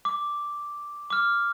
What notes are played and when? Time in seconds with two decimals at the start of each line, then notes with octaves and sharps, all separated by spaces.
0.05 D6
1.10 D6 F6